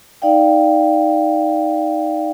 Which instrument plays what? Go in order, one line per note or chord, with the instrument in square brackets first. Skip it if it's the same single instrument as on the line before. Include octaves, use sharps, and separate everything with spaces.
[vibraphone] D#4 D5 F5 G5